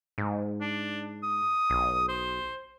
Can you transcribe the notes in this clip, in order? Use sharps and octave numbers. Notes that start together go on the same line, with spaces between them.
G#2
D4
D#6
B1
C5